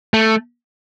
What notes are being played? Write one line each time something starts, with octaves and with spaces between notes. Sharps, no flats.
A3